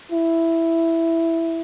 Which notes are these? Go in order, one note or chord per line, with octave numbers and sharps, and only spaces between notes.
E4